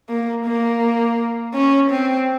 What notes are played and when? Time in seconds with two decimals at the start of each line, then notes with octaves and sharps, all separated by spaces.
0.09 A#3
0.45 A#3
1.54 C#4
1.91 C4